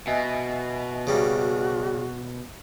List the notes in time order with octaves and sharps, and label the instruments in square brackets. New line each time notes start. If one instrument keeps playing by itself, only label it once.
[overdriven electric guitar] B2 [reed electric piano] D#5 E5 G#5
[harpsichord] C#3 G3 A#3 [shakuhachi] F#4